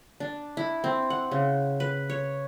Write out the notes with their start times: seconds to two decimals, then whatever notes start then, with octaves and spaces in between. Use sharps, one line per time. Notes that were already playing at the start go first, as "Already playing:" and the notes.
0.20 D4
0.57 E4
0.84 C4
1.10 F#5
1.31 C#3
1.80 B4
2.10 C#5